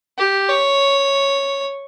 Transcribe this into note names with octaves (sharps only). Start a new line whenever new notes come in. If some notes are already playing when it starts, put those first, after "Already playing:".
G4
C#5